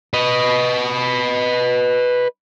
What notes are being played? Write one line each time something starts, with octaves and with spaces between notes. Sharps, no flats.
B4 D#5